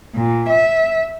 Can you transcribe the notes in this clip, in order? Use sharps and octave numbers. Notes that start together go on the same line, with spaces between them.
A#2
E5